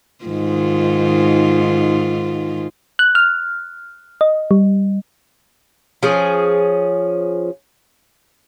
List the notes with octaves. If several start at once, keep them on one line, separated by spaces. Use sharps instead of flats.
G#2 D#3 F4
F#6
F6
D#5
G3
F3 C#4 G#4